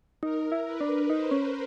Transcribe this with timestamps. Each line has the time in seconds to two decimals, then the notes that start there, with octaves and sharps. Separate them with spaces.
0.22 D#4 A#4
0.52 E4
0.66 B4
0.81 D4
1.10 D#4 C5
1.31 C#4